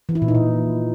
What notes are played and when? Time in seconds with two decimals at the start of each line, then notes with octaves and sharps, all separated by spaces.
0.09 E3
0.15 E4
0.22 A#2
0.28 D#4
0.35 A#2